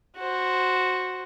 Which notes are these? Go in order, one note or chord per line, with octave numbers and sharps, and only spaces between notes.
F#4 C5